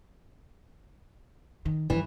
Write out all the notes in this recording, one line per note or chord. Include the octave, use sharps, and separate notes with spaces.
D#3
G2 E3 F3